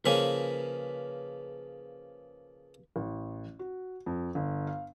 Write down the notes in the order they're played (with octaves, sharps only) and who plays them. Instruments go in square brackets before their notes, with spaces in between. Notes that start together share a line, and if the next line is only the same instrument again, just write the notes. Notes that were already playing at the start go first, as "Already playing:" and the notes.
[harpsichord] C#3 F3 A#3 [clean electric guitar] B4 G#5
[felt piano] A1
F#4
F2
G1
F5